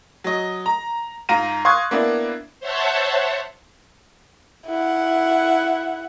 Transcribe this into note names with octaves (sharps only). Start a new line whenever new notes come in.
F#3 D#5
A#5
G#2 F4 A#5 A#6 D#7
F5 C6 C#6 D#6 F#6 G#6
A#3 B3 D4 E4
C5 C#5 E5 F#5 A5
E4 F#5